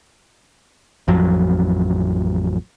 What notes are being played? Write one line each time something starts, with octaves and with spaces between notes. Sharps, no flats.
A1 F2 F3 F#3